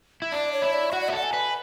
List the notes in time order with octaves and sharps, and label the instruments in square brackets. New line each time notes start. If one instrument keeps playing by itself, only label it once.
[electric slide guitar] E4
[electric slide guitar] D4 [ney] D5
[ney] C#5
[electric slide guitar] E4
[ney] D5
[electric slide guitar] F#4 [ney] F#5
[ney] D5
[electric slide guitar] B4 [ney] E5
[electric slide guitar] A4 [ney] F#5
[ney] G#5
[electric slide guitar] B4